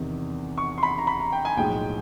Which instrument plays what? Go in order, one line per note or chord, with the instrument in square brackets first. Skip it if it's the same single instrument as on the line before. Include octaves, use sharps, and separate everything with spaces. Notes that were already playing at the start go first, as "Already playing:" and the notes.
Already playing: [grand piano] E2 C3 D#3
C#6
C6
B5
A#5
B5
A#5
G5
G#5
B1 A2 F3 G#3 G5